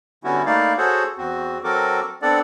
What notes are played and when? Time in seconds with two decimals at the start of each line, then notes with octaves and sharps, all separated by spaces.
0.24 D3 G3 B3 C#4 E4 F#4
0.46 A3 A#3 D#4 E4 D5 F5
0.78 F#4 G#4 A4 C5 C#5 F#5
1.18 E2 C4 F#4
1.64 F#3 C4 F#4 A4 A#4 D6
2.22 B3 C4 D4 A4 D5 F#5